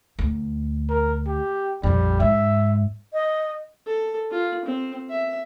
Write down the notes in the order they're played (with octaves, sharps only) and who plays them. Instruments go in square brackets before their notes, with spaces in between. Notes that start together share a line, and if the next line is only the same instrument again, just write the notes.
[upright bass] D2
[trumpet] A#4
G4
[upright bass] A#1 F2 [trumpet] G3
[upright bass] G#2 [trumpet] E5
[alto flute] D#5
[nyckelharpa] A4
F4
C4
E5